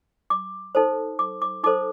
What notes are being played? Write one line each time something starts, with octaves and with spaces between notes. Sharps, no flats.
D6
D#4 A4 C5
D6
D6
D#4 A4 C5 D6